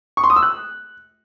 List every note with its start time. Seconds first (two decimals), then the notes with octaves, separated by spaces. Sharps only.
0.17 C#6
0.24 C6
0.30 D#6
0.36 E6
0.43 F#6